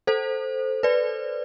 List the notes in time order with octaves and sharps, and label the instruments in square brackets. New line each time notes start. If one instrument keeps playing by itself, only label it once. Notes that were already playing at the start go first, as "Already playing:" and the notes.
[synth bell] A4 C5
B4 D5